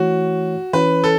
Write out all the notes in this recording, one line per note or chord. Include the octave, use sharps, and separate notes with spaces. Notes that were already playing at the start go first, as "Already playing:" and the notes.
Already playing: E3 A3 E4 F#4 C#5
E3 C#4 E4 B4 C#5
A4